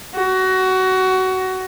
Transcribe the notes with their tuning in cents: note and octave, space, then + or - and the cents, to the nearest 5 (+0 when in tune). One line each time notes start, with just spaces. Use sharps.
F#4 +20